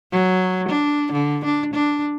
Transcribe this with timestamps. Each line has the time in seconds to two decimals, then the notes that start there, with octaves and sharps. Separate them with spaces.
0.12 F#3
0.68 D4
1.13 D3
1.45 D4
1.74 D4